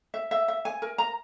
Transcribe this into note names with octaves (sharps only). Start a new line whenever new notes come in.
E5
E5
E5
G#5
A#4
A#5